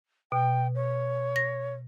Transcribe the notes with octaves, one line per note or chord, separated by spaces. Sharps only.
B2 G5
C#5
A#6